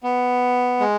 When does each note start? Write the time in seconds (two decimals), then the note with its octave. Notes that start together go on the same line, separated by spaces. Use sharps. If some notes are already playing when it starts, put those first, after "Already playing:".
0.03 B3
0.80 G#3